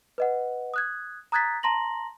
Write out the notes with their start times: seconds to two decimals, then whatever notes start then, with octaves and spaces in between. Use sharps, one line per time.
0.18 B4 D#5 F#5
0.74 D#6 F#6 G#6
1.32 A#5 D#6 F#6 G#6 A6 B6
1.63 A5 A#5 C6 A#6 F#7